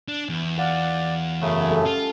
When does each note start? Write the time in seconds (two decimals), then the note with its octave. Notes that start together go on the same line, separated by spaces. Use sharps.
0.08 D4
0.29 E2
0.58 D5 F5 F#5
1.41 F#2 C#3 A3
1.68 C#4 G4 A4
1.86 F4